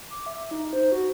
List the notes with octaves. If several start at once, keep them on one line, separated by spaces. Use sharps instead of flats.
D6
E5
D#4
C5
F#4